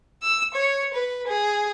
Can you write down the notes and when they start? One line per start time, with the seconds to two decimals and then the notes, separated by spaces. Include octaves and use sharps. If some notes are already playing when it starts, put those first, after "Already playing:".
0.22 E6
0.54 C#5
0.93 B4
1.28 G#4